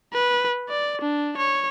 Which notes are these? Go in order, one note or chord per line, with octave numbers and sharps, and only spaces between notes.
B4
D5
D4
C#5